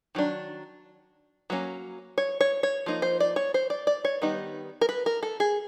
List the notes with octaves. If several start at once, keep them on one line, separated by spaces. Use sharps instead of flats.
D#3 F#3 D4
F#3 A#3 C#4
C#5
C#5
C#5
F3 A#3 D#4
C5
D5
C#5
C5
D5
D5
C#5
D#3 G3 B3 D#4
A#4
B4
A#4
A4
G#4